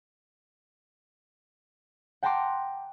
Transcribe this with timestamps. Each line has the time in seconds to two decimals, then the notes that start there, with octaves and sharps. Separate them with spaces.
2.23 F#5 G5 A5 A#5 C6 D6